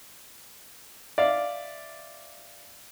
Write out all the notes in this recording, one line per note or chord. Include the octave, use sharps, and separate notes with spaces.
D5 E5 F5